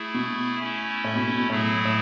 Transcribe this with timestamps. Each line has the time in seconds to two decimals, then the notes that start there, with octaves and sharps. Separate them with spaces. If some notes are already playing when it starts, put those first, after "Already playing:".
Already playing: A3 E4 G#4
0.14 B2
0.59 A3 C#4 E4
1.04 A2
1.15 B2
1.27 B2
1.38 B2
1.50 A2 F#3 A3 E4 G#4
1.85 A2